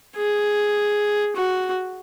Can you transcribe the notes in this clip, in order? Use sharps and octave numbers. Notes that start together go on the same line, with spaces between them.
G#4
F#4